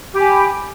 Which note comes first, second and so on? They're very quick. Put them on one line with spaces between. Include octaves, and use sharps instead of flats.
G4 B5 G#5